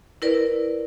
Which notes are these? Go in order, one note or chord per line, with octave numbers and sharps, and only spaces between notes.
E4 A#4 B4 D5